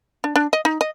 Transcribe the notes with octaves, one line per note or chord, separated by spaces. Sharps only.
D4
D4
D#5
D#4
D#5